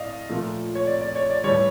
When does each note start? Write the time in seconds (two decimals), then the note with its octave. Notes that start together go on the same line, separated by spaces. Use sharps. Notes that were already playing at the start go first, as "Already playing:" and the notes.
Already playing: A2 D5 D#5 F5
0.29 A#2 F3 A3
0.75 C#5
0.87 D5
1.01 D5
1.16 C#5
1.30 D5
1.44 A2 E3 G3 C#5